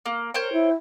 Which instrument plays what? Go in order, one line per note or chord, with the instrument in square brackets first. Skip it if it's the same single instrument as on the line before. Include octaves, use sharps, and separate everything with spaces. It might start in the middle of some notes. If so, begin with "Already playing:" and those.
[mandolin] A#3
[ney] A#4 [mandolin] C5 C#5 G5
[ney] E4